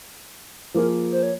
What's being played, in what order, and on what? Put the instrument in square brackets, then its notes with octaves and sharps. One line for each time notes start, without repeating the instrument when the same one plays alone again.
[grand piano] F3 A#3 F4 G#4 [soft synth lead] A#4
[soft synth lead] C5
C#5